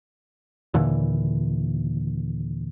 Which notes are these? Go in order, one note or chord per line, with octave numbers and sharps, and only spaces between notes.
D#2 A#2 D3 E3